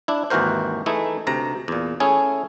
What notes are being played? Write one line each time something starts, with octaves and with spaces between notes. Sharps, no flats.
D4 E4
G#1 D#2 E3 F#4 A#4 C5
E3 A3 D#4 E4 G#4
D2 C3 A#5
E2 A#2
A3 C#4 E4 G#4